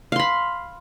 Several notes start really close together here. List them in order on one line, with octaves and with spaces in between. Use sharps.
F5 C6 B5